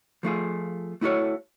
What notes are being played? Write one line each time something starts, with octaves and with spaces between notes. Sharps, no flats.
F3 A3 F4 G#4
A3 E4 F#4 A4 C#5